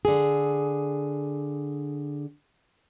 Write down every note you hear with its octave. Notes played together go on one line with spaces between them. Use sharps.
D3 G#4